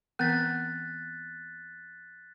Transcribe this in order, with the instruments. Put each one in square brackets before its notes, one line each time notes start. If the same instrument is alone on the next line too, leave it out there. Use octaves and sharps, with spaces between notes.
[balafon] E3 B3 C4 [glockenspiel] F#6 A6 B6